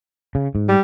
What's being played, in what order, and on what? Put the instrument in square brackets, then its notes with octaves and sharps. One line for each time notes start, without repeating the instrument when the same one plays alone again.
[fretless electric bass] C#3
G#2
[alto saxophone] G3